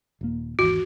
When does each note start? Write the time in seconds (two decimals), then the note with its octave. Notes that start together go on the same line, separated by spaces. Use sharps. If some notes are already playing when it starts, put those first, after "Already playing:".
0.21 D#1 A#3
0.59 G#1 E2 F#4